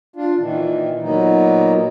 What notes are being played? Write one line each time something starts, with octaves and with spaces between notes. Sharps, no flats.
D4 F4
A#2 D#3 E3
A#2 F#3 A#3 B3 D#4